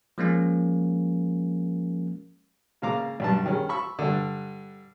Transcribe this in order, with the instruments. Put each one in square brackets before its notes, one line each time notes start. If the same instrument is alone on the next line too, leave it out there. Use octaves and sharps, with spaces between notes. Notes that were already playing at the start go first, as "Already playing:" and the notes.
[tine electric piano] F3 G#3 A#3 C#4
[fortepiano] G#2 C#3 A#3 F5 A#5 D6
B1 G2 A5
D#3 G3 G#3 C#4
B5 C#6 E6
G2 D3